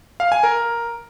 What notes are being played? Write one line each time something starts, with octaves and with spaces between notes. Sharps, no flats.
F5
G#5
A#4